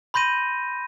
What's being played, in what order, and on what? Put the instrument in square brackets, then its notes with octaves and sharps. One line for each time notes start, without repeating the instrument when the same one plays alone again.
[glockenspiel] B5 C6 G6 A#6 D#7